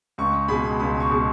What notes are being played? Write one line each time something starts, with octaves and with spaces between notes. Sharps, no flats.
C#2 C#6
B2 G#3 B5
C#2 B5
C#6
B2 G#3